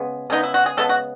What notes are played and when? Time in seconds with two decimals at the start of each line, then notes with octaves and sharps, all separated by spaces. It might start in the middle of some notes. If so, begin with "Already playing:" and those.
Already playing: C#3 G#3 B3
0.30 C#3 G#3 B3 D#4
0.43 E4
0.54 F#4
0.66 G#4
0.77 C#3 G#3 B3 A4
0.89 F#4